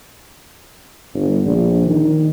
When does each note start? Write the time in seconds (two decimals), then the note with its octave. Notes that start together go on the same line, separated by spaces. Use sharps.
1.14 G1
1.45 A#1
1.86 D#3